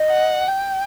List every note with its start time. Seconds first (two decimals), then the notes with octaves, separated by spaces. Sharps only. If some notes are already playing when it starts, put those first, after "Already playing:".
Already playing: D#5
0.11 F#5
0.47 G5